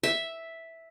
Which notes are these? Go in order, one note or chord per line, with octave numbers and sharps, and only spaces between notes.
E5